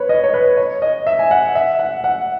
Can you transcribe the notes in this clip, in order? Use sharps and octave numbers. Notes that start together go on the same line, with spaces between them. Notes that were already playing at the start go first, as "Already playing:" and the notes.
Already playing: B4 C#5
D#5
C#5
B4
C#5
D#5
E5
G#5
F#5
E5
F#5
F#5